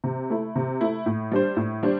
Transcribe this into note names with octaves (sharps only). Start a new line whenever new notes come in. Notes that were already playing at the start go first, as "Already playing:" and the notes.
C3
A3 E4
C3
A3 E4
A2
G3 D4 C5
A2
G3 D4 C5